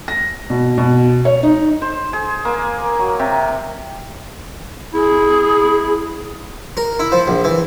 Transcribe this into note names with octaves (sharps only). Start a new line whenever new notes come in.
A#6
B2
B2
C#5
D#4
C5
G#4
A#3
F#3
C3
E4 G#4
A#4
E4
F3
A#1
E3